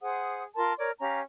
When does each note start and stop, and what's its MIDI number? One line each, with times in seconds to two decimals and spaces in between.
0.01 0.43 68
0.01 0.43 72
0.01 0.43 78
0.01 0.43 87
0.55 0.73 65
0.55 0.73 70
0.55 0.73 81
0.55 0.73 84
0.78 0.92 70
0.78 0.92 73
0.78 0.92 74
1.00 1.21 61
1.00 1.21 67
1.00 1.21 77
1.00 1.21 82